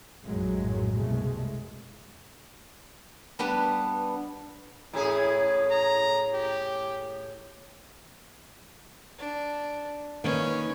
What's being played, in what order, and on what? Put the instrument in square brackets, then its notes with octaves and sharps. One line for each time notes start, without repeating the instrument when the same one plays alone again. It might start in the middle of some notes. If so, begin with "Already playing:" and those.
[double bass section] A#1 F#2 A2 C#3 F#3 G#3
C2 B2 G#3 A3
[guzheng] G3 B3 D4 B4
[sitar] A2 C#4 G#4 [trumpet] E4
[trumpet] A#5
G4
[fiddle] D4
[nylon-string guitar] D#3 A#3 D#4 [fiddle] C#4 B4